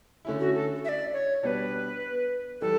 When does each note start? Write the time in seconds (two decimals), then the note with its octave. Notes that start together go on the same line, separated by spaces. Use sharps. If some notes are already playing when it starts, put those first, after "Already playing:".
0.25 D3 A3 C#4 E4
0.40 F#4
0.55 A4
0.85 E5
0.89 D5
1.13 C#5
1.43 B2 G3 B3 D4 B4 C#5
2.61 E3 G3 A4